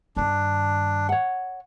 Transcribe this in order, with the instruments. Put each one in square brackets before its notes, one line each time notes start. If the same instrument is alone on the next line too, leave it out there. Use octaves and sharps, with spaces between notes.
[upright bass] G2 D#3 [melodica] D4
[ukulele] C#5 F#5